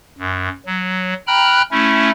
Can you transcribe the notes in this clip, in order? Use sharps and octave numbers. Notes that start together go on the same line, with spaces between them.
F#2
F#3
G5 A#5 B5 F6 F#6
A3 C#4 E4